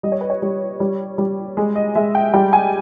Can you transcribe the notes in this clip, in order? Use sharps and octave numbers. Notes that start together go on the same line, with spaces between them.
G3 D#5
C#5
B4
C#5
G3
G3
G3
G#3
D#5
G#3 E5
G5
G3 G5
G#5